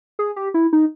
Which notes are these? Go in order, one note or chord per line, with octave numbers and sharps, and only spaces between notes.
G#4
G4
E4
D#4